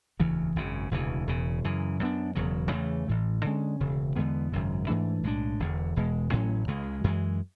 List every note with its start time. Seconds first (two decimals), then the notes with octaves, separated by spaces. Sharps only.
0.20 E1 D2 C#3 E3
0.56 G#1 F#2 C#3
0.91 E1 D2 C#3 E3
1.27 E1 E2 C#3
1.64 F#2 C#3 E3
2.00 F#2 E3 B3 D4
2.35 E1 E2 C#3 F#3
2.71 E2 C#3 E3 A3
3.08 A1 A2 E3
3.43 D2 D3 G#3 C#4
3.80 E1 D2 C#3
4.16 E2 D3 G#3 B3
4.52 G#1 F#2 C#3
4.88 G#2 E3 A3 D4
5.23 B1 A2 G#3 D4
5.60 E1 E2 D3
5.96 E1 E2 B2 G#3
6.32 A1 A2 F#3 C#4
6.68 C#2 C#3 G#3
7.04 F#2 E3 G#3